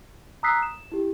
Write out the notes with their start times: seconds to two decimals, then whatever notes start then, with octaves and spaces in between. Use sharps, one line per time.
0.43 A#5 D#6 E6 F#6 B6 C7
0.63 E7
0.92 E4 G4